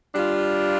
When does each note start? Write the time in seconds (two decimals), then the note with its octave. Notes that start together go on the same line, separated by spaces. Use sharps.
0.14 G3 D4 F4